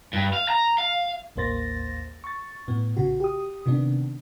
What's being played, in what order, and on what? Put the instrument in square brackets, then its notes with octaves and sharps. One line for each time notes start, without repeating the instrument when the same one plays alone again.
[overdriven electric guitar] G2
F5
A#5
F5
[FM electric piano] A1 D#2 A#3 C5 A6 A#6
C#6 A6
A2 B3
A#1 C#3 F#4
G4 D#6
C3 D#3 B3 D4